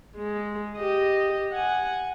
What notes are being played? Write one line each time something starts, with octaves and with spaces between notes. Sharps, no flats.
G#3
G4 D#5
F#5 G#5